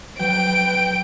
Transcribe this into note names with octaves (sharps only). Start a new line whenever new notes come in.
F#3 B4 G5 D7